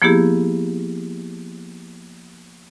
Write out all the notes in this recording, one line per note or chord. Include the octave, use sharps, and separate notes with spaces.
F3 A#3 B3 E4 G4 G#4